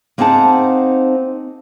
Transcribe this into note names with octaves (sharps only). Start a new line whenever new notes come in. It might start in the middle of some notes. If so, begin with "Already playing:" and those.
A#3 C4 D#4 G#4 F#5 A5